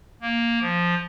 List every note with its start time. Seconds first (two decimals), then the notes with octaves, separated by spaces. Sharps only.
0.22 A#3
0.62 F3